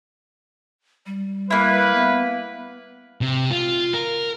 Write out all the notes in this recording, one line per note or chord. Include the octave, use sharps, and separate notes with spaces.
G3
A#3 E4 B4
B3
C3
F4
A#4